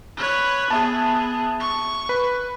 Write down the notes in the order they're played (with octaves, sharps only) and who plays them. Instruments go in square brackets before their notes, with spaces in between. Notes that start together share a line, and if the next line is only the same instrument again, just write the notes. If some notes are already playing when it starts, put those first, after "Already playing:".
[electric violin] B4 C#5
[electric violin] B3 G#4 [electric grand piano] E5 A5
[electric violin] C#6
[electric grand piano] B4 B5